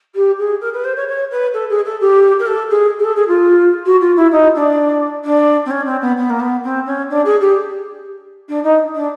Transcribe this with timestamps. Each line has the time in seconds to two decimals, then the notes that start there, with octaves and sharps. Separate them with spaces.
0.15 G4
0.38 G#4
0.61 A#4
0.73 B4
0.84 C5
0.96 C#5
1.08 C#5
1.30 B4
1.53 A4
1.69 G#4
1.85 A4
2.00 G4
2.39 A#4
2.46 A4
2.70 G#4
2.99 G#4
3.04 A4
3.16 G#4
3.28 F4
3.85 F#4
4.00 F4
4.16 E4
4.31 D#4
4.55 D4
5.24 D4
5.65 C4
5.70 C#4
5.85 C4
6.01 B3
6.17 B3
6.29 A#3
6.40 B3
6.63 C4
6.86 C#4
7.10 D4
7.25 G#4
7.40 G4
8.48 D4
8.63 D#4
8.94 D4